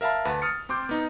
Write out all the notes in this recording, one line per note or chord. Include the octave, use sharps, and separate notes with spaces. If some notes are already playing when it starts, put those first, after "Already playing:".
A#4 E5 F5 A5 B5
D2 B4 F#5 A5 B5
D#6 F6 A6 C#7
C4 C6 D6 G6
B3 D#4